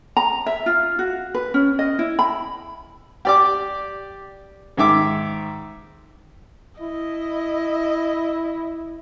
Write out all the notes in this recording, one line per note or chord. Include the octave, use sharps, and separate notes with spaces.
A#5
E5
F4
F#4
B4
C#4
D#5
E4
B5
G4 D5 D6
G#2 D#3 E5 D6
E4 D#5